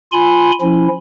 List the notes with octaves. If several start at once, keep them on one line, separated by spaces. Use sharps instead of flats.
F4 G#5 B5 C6
F3 C#4 E4